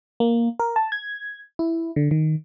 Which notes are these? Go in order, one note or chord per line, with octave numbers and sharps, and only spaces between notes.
A#3
A#4
A5
G#6
E4
D3
D#3